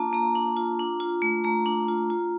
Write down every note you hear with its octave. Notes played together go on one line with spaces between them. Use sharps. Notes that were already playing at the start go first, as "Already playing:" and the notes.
Already playing: A#3 D4 F4 A5 A#5
A#3 A#5
D4
F4
D4
F4
A3
A3 A#5
D4
F4
F4